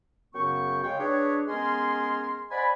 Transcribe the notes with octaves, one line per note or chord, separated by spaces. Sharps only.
F#2 C#3 B3 G5 C#6
G#3 C#5 F5 G5
D4 G#4 B4 C#5
G#3 B3 C#4 A#4 G#5 C6
C5 D5 D#5 F#5 G#5 B5